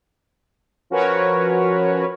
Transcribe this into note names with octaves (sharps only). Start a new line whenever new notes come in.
F3 C#4 F#4 A#4 B4 C#5